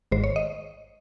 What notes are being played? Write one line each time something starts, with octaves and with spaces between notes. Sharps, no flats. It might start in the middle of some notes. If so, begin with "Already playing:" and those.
G#1 G#2 D#3 C5
C#5
D#5